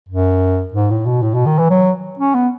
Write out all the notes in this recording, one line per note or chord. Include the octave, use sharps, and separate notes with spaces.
F#2
G#2
A2
B2
A2
B2
D#3
E3
F#3
C#4
B3